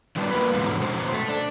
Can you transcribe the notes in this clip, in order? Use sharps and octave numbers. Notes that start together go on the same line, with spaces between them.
D#3 F#3 G3 B3 D4
A#3 F4 B4
G#2 B2 D3 E3 F#3 G#3
F2 B2 F#4 C5
A3
D4